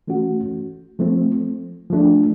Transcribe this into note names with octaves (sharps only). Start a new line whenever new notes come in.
E3 A3 C#4 F#4
F3 A3 C4
F3 A3 D4